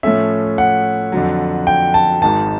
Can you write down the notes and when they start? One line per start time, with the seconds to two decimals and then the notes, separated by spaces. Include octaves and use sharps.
0.03 A2 F3 A3 C#4 E5
0.58 F#5
1.12 F2 D3 F#3
1.67 G5
1.94 A5
2.22 G#1 G#2 D#3 A5